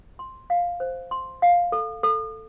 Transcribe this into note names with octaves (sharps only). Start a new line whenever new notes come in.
C6
F5
C5
C6
F5
A4
A4